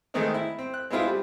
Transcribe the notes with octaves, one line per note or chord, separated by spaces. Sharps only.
D#3 G#3 A3 B3 C4 D#4
E4
C4
F#6
G#3 B3 C4 E4 F4
G3